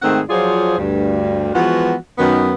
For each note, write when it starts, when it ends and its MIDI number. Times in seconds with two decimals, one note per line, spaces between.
0.02 0.20 44
0.02 0.20 51
0.02 0.20 57
0.02 0.20 60
0.02 0.20 68
0.02 0.20 78
0.29 0.77 53
0.29 0.77 54
0.29 0.77 65
0.29 0.77 68
0.29 0.77 72
0.29 0.77 74
0.78 1.50 38
0.78 1.50 43
1.54 1.94 52
1.54 1.94 53
1.54 1.94 56
1.54 1.94 59
1.54 1.94 66
2.19 2.54 42
2.19 2.54 51
2.19 2.54 59